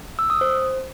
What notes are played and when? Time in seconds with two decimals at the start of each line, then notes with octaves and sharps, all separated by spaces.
0.19 E6
0.30 D#6
0.41 C5